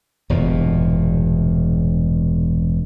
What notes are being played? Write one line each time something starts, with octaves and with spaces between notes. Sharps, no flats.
E1 G2 A#2